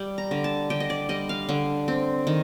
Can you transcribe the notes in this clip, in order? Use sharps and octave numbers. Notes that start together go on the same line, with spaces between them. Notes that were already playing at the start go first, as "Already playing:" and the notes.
Already playing: G3 G5
A#5
D3
A5
D3 G5
D#5
D5
G3 D#5
F5
D3
C4
D#3